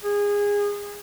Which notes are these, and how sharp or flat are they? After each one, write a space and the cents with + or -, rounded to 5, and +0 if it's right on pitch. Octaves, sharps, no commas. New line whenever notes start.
G#4 -20